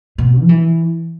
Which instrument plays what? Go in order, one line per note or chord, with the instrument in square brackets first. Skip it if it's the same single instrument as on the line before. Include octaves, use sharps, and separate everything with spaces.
[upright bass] B2
F3
E3